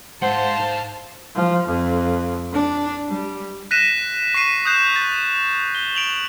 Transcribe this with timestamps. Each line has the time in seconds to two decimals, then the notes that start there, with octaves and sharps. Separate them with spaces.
0.22 G#2 C5 F5 F#5 A5
1.36 F3
1.67 F2
2.53 D4
3.10 G3
3.71 F#6 A#6 B6 D#7 E7
4.34 C#6 B6 C7 D#7
4.65 D#6 F#6 G6 C7 E7
4.96 A6
5.75 G7
5.95 D7 F7 F#7